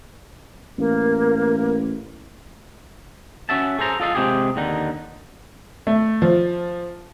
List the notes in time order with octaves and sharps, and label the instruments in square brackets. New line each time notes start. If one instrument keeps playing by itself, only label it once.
[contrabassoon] A1 [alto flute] A#3
[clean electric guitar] C#4 F#4 E5 A5
G#4 A4 C5 A#5
F4 A4 D#5 F5
C3 G#3 C4 G4 G#4
D#2 D3 D#4
[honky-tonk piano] A3
F3